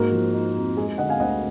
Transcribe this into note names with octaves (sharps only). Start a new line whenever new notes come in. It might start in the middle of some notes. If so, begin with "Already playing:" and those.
Already playing: G#2 A#3 F#4 A#4
F3
D#4
F2
G#3 G#4
G#4
D3 D#5 F#5
F5 G#5
D2 D#5 F#5